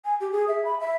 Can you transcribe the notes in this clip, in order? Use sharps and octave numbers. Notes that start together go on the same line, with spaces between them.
G#5
G4
G#4
E5
B5
E5